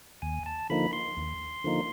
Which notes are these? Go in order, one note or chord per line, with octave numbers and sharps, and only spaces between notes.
D#2 G#5
A5
D3 F3 A#3 D#4 B5
C6
D#2
D3 F3 A#3 D#4